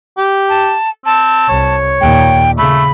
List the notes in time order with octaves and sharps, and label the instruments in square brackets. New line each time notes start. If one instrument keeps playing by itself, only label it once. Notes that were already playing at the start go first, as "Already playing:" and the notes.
[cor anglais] G4
[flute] A5
[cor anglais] C4 [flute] A5
[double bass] C2 [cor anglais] C#5
[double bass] D#2 A#2 [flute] G5
[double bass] C#3 [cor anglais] A3 [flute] B5